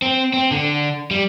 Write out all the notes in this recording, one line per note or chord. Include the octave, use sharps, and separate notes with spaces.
C4
C4
D3
G3